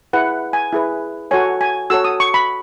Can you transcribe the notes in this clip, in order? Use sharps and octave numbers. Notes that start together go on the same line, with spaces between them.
E4 G#4 B4 F#5
G#5
E4 G#4 B4
F#4 A4 C#5 G#5
G#5
F#4 A4 C#5 E6
D#6
C#6
B5